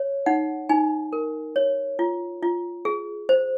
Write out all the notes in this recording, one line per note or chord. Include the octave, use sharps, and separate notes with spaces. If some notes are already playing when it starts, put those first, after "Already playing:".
Already playing: C#5
D#4 F#5
D#4 G#5
A#4
C#5
F4
F4
G#4
C5